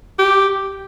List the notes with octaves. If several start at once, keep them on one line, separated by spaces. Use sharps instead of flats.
G4